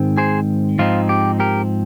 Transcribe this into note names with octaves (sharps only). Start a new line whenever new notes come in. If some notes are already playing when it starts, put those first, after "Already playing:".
Already playing: G#2 D#3 G#3 C4
G#4 C5
G#2 F3 C4 D#4 F4
G4
G4 A#4